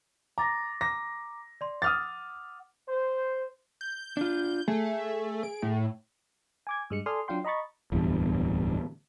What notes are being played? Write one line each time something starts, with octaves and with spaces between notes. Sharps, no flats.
A#5 D6 A6 A#6
A#5 D6 A#6
D5 C6
F#5 D6 D#6 F6 A6
C5
G6
D4 F4
A3 G#4
D7
A2
G#5 D6 G#6
G2 G#3 C#7
A4 D5 G#5 C6 D#6 F6
F#3 D4 F4 F5 G5 C6
D#5 A#5 B5 C#6 A6
D1 E2 G2